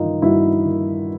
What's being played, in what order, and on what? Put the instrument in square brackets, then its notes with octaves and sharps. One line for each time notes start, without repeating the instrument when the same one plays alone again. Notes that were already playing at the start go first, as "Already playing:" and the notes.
Already playing: [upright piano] G2 D#3 D#4 F4
G2 E4 F#4
D#3